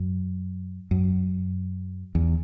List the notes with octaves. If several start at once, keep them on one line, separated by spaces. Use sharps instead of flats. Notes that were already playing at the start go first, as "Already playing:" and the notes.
Already playing: F#2
F#2
E2